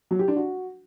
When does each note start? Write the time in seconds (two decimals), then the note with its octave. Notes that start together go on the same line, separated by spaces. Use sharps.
0.11 F#3
0.19 G4
0.28 D4
0.36 F#4